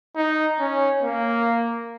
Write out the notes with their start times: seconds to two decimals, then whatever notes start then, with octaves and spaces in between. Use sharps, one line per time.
0.16 D#4
0.60 C#4
1.03 A#3